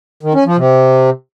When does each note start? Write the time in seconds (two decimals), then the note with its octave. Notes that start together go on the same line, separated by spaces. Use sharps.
0.23 D#3
0.34 C#4
0.46 F3
0.57 C3